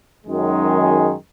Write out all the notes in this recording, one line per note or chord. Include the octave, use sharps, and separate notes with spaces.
F#2 D#3 G#3